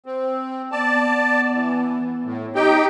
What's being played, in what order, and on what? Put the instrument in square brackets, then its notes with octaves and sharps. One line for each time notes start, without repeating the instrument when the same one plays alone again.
[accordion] C4
[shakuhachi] B3 [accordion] D5 A5
[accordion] E3
A2
D#4 G4 G5